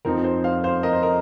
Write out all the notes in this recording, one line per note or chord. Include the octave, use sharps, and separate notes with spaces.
F2 F3 C4 D#4 A#4
C5
C5 F5
C5 F5
A#4 D#5
C5
A#4 D#5